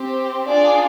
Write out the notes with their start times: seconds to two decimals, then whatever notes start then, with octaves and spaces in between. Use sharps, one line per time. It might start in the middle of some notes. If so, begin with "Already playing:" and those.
Already playing: C4 G4
0.48 D4 F4 G#4 D5